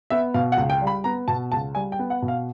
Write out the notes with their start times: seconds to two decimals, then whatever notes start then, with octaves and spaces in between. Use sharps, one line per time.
0.10 B3 E5
0.34 B2 F5
0.52 F#5
0.57 C#2
0.70 G5
0.81 G3
0.87 B5
1.04 B3 A#5
1.28 B2 A5
1.52 C#2 A5
1.75 G3 G#5
1.92 G5
1.99 B3
2.10 F#5
2.22 B2
2.28 F5